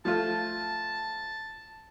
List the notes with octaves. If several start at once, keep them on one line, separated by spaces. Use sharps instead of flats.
F3 A3 F4 A5